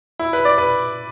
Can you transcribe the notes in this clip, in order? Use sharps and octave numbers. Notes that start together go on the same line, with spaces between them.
E4
B4
D5
B4